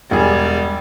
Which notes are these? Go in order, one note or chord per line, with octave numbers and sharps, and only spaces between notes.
E1 G3 G#4